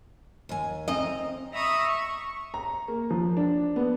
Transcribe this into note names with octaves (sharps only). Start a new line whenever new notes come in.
D#2 G#5
C4 D#5 A#5
E5 A#5 B5 C#6 D#6 E6
C#6
A#5
A#3
F3
D4
B3